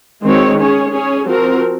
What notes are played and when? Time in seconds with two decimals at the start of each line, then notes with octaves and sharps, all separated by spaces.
0.23 D#3 G#3 C4 F#4 C#5
0.58 C#4 G#4 C#5
0.92 C#4 G#4 C#5
1.26 F3 C4 F#4 A#4